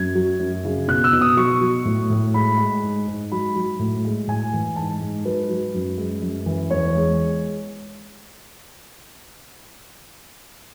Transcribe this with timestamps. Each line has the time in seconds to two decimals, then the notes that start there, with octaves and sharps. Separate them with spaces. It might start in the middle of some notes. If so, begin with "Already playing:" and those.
Already playing: F#2 G#6
0.15 F#3
0.39 F#2
0.65 C#3
0.88 B2 F#6
1.04 E6
1.13 B2
1.21 D#6
1.37 F#3 C#6
1.61 F#3
1.85 A2
2.10 A2
2.34 G#3 B5
2.58 G#3
2.83 G#2
3.08 G#2
3.32 F#3 B5
3.56 F#3
3.79 A2
4.05 G#3
4.28 A2 G#5
4.53 E3
4.76 G#2 A5
5.01 G#2
5.25 F#3 B4
5.49 F#3
5.74 F#2
5.98 G#3
6.22 F#2
6.46 E3
6.71 E2 C#5
6.95 G#3